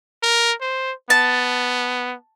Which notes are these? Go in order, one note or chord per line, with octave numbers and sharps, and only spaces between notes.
A#4
C5
B3 A5